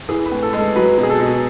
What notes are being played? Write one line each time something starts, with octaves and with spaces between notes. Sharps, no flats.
E3 G#4
B4
A2
A4
G#3
A4
F#3 B4
B2
G#4
A4
B2